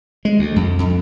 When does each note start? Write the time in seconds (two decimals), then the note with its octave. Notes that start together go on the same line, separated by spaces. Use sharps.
0.25 G#3
0.39 D2
0.56 F2
0.79 F2